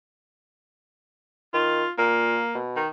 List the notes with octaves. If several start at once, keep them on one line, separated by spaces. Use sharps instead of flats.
D#3 F4
A#2 A#3
B2
D#3